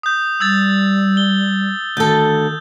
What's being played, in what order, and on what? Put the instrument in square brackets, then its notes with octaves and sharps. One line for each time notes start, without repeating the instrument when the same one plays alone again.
[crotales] D#6 G6
[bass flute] G3 [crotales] E6 G#6 A6
[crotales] G7
[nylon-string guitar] D2 A4 [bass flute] D#3 [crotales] G6